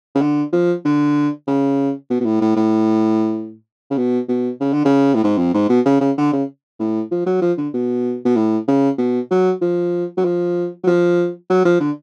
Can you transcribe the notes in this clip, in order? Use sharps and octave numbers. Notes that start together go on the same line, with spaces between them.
C#3
D3
F3
D3
C#3
B2
B2
A2
A2
A2
C#3
B2
B2
C#3
D3
C#3
A2
G#2
F2
G#2
B2
C#3
C#3
D3
C#3
A2
F3
F#3
F3
D3
B2
B2
A2
C#3
B2
F#3
F3
F#3
F3
F#3
F3
F#3
F3
D3